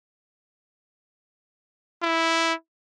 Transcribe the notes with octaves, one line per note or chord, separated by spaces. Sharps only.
E4